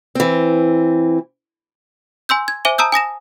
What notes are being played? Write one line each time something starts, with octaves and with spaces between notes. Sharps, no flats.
E3 C4
G#5 C6 E6 G6
G#6
C5 E5 G#5 D6 D#7 G7
A5 A#5 D#6 E6 G6
G#5 D#6 A#6 E7